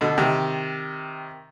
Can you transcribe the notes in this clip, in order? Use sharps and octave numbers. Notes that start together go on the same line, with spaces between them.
B2 D3
C3 D#3